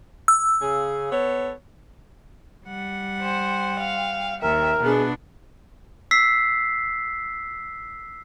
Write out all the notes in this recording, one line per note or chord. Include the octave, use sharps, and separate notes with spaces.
E6
C#3 G#4
B3 A4 C#5
G3 F#5
C5 G5
F5
D#2 A#4 E5
B2 B3 D4 G#4
E6 B6 C7